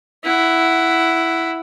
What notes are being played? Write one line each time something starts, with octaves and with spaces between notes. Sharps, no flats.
E4 F#5